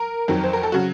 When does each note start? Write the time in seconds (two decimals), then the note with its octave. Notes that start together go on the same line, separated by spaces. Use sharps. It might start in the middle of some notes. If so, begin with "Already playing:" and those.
Already playing: A#4
0.28 F2 D#3 F#3
0.44 C5
0.53 A#4
0.63 A4
0.72 C#3 F#3 F#4